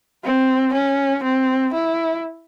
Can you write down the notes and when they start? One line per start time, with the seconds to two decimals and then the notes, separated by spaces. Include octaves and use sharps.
0.24 C4
0.74 C#4
1.23 C4
1.74 E4